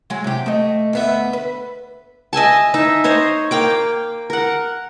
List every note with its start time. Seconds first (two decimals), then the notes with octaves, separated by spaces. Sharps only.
0.10 F#3 G#3
0.24 C3 G4
0.46 A3 D#5
0.93 D2 B3 E5
1.33 B4
2.33 D#5 E5 G#5 A5
2.74 D#4 E5
3.04 C5 C#5 D#5 C6
3.51 A#3 F5 G5 D6
4.30 A#4 F#5